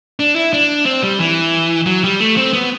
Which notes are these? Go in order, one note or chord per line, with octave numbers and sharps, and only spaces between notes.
D4
E4
D4
C4
G3
E3
F#3
G3
A3
C4
B3